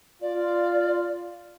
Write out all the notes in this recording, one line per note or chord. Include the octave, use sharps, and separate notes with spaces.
F4 D5